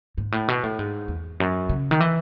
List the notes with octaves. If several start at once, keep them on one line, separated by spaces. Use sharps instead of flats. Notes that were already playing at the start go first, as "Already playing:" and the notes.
G#2
A2
B2
A2
G#2
E2
F#2
C#3
D#3
E3